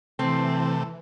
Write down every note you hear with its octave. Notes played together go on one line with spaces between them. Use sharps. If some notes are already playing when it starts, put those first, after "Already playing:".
C3 E3 A3 C4